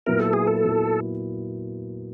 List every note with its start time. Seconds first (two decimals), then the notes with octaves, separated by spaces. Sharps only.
0.06 A#2 F#3 B3 E4 A#4
0.20 A4
0.33 G#4
0.47 A4
0.65 A#2 F#3 B3 E4